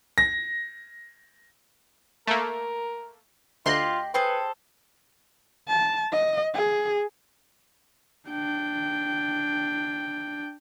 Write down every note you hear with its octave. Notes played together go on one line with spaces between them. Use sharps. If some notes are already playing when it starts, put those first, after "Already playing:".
A#6
A3 A#3 A#4
D2 F4 G4 D#5 C6 F#6 A#6
G#4 A4 B4 C5 G5
A5
D#5
G#4
D4 G5